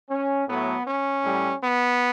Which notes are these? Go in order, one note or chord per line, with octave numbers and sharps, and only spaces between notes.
C#4
A2 F#3 A3 B3
C#4
A2 G3
B3